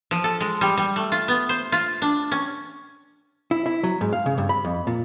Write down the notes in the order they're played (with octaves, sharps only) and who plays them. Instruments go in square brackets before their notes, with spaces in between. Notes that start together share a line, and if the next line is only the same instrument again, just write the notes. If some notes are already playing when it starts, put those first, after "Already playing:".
[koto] F3
A4
G#3
G3
G3
A3
F4
B3
C5
F4
D4
C#4
[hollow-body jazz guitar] E4
E4
F#3
G#2
F5
C#3
G2
B5
F2
A#2